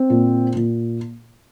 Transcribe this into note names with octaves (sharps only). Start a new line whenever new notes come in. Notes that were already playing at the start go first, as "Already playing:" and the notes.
Already playing: C4
A#2
A#2